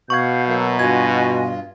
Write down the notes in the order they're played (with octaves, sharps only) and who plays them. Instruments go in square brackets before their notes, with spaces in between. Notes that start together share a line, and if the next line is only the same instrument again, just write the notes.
[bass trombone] B2 [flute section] F5 F#5 G6 [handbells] C#6 G#6
[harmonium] F#3 A#3 E5
[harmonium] G2 F4 [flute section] F#4 D#5 G#5 [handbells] G#6